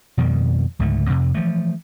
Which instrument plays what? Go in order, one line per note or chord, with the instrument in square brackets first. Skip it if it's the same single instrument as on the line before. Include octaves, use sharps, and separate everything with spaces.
[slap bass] F2 B2 D#3 G3
C#2 G#2 D3 A3
F2 C3
E3 F3 A3